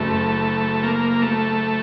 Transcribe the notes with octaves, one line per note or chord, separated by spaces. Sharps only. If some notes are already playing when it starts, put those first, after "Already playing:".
Already playing: F#1 F#3 A3
A#3
A3